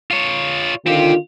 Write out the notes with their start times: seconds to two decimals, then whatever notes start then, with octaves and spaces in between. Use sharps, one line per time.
0.11 F4 C#5
0.86 D3 D#3 C4 F4 G4